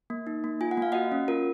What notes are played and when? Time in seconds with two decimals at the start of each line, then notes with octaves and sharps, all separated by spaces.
0.10 A#3
0.27 D#4
0.44 A#3
0.61 F4 G#5
0.71 F#5
0.77 A#3 F5
0.92 F#4 D#5 F#5
1.12 C#4
1.28 F4 A#4